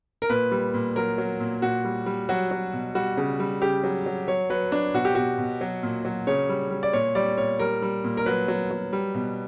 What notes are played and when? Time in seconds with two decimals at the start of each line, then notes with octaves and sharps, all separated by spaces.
0.22 A#4
0.29 A#2 B4
0.52 G3
0.74 A#2
0.96 F#3 A#4
1.18 F#3
1.40 A#2
1.62 A#2 F#4
1.85 G3
2.06 G3
2.29 F#3 F#4
2.51 F#3
2.73 B2
2.95 G3 F#4
3.17 C#3
3.40 G3
3.62 C#3 G4
3.84 F#3
4.06 F#3
4.28 F#3 C#5
4.50 F#3 B4
4.72 F#3 D4
4.94 B2 F#4
5.05 G4
5.15 B2 F#4
5.38 B2
5.61 F#3
5.83 A#2
6.05 F#3
6.27 C#3 C#5
6.49 G3
6.71 G3
6.83 D5
6.93 A#2 C#5
7.15 G3 D5
7.37 A#2 C#5
7.59 G3 A#4
7.82 G3
8.04 A#2
8.17 A#4
8.26 F#3 B4
8.48 F#3
8.71 F#3
8.93 G3
9.15 B2